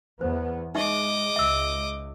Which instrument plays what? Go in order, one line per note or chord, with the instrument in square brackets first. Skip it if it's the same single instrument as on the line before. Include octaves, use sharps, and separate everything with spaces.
[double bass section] E2 B3 [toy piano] C5
[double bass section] G#3 [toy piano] D#4 E5 C#6 [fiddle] D#5 D6
[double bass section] C#2 [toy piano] E5 E6